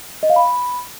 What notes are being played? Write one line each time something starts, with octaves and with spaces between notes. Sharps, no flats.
D#5
F5
B5